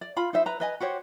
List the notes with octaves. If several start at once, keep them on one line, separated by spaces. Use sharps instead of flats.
D5
F4 B5
D#4 C5 E5
B4 A#5
B4 D#5 G#5
F#4 G4 C5 C#5